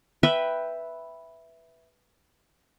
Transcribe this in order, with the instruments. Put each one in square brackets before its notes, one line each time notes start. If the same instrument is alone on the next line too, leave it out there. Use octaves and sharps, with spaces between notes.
[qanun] B4 E5 G5 B5